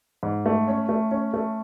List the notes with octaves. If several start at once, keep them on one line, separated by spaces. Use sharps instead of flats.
G#2
A3
C#4
A3
C#4
A3